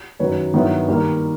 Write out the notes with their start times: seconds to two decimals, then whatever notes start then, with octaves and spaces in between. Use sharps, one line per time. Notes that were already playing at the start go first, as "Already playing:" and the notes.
0.19 F#2 D#3 F#3 B4 C#5
0.54 G2 D#3 F#3 B3 E4
0.88 D#3 G3 A#3